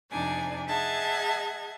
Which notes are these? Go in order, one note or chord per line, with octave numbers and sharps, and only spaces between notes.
F2 C3 D4 D#4 D5 G#5
G#4 D#5 E5 F#5 A5 G#6